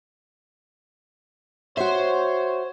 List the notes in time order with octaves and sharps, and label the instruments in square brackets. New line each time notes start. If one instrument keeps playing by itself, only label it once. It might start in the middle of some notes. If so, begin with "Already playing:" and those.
[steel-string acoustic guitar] F#4 E5 [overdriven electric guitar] C5 [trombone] C#5